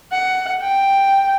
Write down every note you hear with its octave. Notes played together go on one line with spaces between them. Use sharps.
F#5
G5